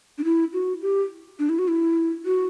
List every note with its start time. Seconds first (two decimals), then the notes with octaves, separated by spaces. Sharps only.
0.18 D4
0.24 E4
0.53 F#4
0.82 G4
1.39 D4
1.49 E4
1.59 F#4
1.68 E4
2.26 F#4